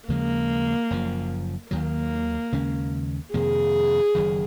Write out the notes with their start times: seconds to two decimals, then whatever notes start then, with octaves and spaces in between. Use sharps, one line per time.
0.09 D#2 C#3 F3 G#3 A#3
0.91 F#1 F#2 F3
1.71 D#2 D#3 F#3 A#3
2.53 D#2 C#3 G#3 C#4
3.34 F2 C3 D#3 A#3 G#4
4.15 F#1 F#2 D#3